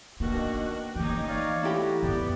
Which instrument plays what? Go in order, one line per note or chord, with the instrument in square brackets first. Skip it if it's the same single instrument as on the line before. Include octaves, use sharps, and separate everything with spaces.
[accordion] B2 D#3 [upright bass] A#3 [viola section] D4 F#4
[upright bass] E3 A#3 [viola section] C#4 D#4 [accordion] G4 G5
[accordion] C#5 D5 F5
[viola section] A3 [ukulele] E4 G4 B5 [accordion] F#4 A#5
[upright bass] F2 [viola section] B3 [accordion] D5 G5